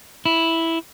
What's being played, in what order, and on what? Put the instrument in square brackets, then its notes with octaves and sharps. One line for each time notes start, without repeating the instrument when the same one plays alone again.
[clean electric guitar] E4